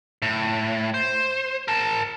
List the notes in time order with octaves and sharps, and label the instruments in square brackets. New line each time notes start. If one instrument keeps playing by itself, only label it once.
[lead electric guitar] A2
C5
A#4 A5